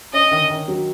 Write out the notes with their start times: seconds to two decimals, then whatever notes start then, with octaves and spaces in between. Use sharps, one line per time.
0.13 C#4 D#5
0.31 D#3
0.50 D#3
0.68 F#3